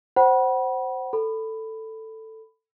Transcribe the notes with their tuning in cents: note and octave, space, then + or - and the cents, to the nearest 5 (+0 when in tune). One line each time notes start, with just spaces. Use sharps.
C5 +0 F#5 +30 B5 -30
A4 +10 B5 +10